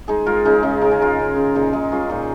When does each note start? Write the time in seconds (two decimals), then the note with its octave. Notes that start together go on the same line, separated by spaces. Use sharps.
0.08 G#3 D#4 G#4
0.26 G#3 F4 A#4
0.45 C#3 D#4 G#4
0.63 C#3 D#4
0.82 C#3 A#4
0.91 G#4
1.00 G#3 F4 A#4
1.19 C#3
1.36 C#3
1.55 A#2 D#4 G#4
1.73 G#3 D#4 G#4
1.92 G#3 C#4 F4
2.10 A#2 D#4